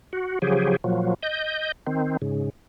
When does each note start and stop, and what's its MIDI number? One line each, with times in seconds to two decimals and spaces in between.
0.13 0.39 66
0.42 0.76 49
0.42 0.76 53
0.42 0.76 54
0.42 0.76 67
0.42 0.76 68
0.84 1.14 46
0.84 1.14 53
0.84 1.14 54
1.23 1.72 75
1.23 1.72 91
1.87 2.17 51
1.87 2.17 60
2.22 2.50 44
2.22 2.50 49